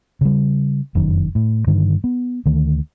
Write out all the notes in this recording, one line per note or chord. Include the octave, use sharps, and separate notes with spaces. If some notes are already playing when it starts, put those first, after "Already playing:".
C#3 G3
F1 F#2 D#3
A2
G2 D3 D#3
B3
D2 D#3 A3